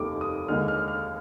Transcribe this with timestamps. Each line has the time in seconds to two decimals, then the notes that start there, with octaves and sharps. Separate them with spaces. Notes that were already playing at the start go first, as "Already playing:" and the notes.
Already playing: F1 D#2 D#3 G3 D6
0.21 D#6
0.48 D#2 D3 G#3 F6
0.68 F6
0.88 F6